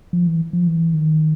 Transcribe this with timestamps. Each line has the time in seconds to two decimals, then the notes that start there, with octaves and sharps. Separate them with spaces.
0.13 F3
0.27 E3
0.53 F3
0.67 E3
0.94 D#3